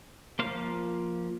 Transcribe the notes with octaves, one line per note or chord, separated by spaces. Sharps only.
F3 A#3 C5 F5